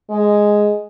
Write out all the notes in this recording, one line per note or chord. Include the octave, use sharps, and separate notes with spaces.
G#3